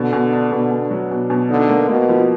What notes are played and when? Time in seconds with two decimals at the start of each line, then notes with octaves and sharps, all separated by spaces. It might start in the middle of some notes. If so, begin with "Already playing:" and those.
Already playing: B2 D3
0.13 B2
0.33 D4
0.52 B2
0.71 B2
0.91 F#3
1.11 B2
1.30 B2
1.49 D3 D#4
1.69 A#3
1.89 B2 A#3
2.09 F3